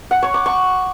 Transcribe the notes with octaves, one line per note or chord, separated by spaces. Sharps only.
F#5
C#5
D6
C#6